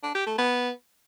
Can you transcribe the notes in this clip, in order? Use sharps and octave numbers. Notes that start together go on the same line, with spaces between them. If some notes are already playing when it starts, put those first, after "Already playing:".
D4
G4
A3
B3